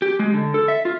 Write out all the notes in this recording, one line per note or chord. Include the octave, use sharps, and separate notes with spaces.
G4
G#3
D3
A4
E5
F4